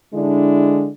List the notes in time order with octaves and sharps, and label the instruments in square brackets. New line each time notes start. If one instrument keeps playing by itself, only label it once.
[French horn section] D3 G#3 D4 E4